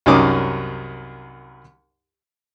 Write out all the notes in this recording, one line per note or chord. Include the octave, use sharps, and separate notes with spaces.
C2 F#2 C#4 D#4 D6 D#6